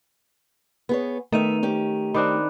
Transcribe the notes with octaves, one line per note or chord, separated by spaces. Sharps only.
B3 G#4 C#5
D#3 A3 B3 E5 A#5 D#7 F7
C#4 G4
D#3 C4 D4 B5 D6 F#6